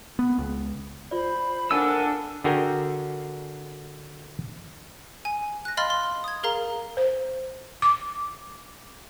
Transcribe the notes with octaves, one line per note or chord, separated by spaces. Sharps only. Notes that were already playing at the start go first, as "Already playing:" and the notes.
B3
C#2
F4 C5 D5 B5
D4 A4 A#4 F5 F#5 G#5 E6
D3 F#4 G#4 A#4 G5 G#5
G#5
F#6 A#6
D#5 F5 B5 C6 F6 A6
C6
D#6 G#6
G#4 A#4 F5 A#5
C5
D6